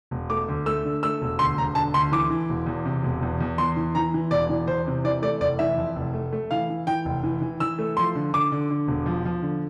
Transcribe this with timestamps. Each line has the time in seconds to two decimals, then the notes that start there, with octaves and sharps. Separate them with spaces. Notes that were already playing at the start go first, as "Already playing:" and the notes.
0.11 E1
0.30 A3 D6
0.48 D2
0.66 A3 E6
0.85 D3
1.03 A3 E6
1.22 E1
1.39 D2 C6
1.58 E1 A#5
1.75 D3 A5
1.94 D2 C6
2.12 E3 D6
2.30 E3
2.49 E1
2.67 E2
2.85 C3
3.03 E1
3.23 E2
3.41 E2
3.58 E2 C6
3.76 E3
3.95 E3 A#5
4.14 E3
4.31 E1 D5
4.49 E3
4.67 E2 C5
4.87 C3
5.04 E3 D5
5.22 A3 D5
5.41 F1 D5
5.59 E3 E5
5.77 F2
5.96 F1
6.14 A3
6.32 A3
6.51 E3 F5
6.70 E3
6.87 E3 G5
7.05 F1
7.23 E3
7.41 E3
7.60 E3 E6
7.79 A3
7.97 F3 C6
8.15 D3
8.33 D3 D6
8.52 D3
8.70 D3
8.88 E1
9.06 F3
9.25 F3
9.42 D3